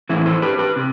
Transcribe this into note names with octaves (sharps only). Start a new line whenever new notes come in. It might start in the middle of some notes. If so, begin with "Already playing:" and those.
A2 E3 C4 E4
A4 C5
G4 B4
G4 B4
C3